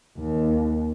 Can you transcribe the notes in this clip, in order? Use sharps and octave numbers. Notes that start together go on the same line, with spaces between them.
D#2